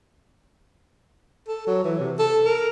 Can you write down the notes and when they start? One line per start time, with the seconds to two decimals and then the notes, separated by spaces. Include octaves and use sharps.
1.48 A4
1.67 F#3
1.84 E3
1.99 C3
2.19 A4
2.45 A#4